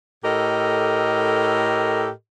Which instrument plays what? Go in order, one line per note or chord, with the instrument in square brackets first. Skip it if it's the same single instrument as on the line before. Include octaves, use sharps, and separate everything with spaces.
[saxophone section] A2 G4 A4 A#4 D#5